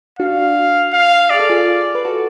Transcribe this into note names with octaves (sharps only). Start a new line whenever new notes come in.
D4 F#4 F5
F5
G#4 D5
A4
F4 G#4
B4
F#4 A4